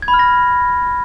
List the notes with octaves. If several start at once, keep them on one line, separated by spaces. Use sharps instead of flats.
G#6
B5
F6
A#6